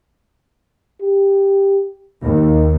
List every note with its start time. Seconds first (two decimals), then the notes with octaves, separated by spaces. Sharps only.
1.01 G4
2.24 D#2 D#3